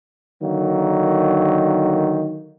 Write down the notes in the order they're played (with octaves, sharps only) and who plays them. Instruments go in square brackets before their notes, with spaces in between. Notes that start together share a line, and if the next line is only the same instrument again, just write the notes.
[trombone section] D3 D#3 F#3 A#3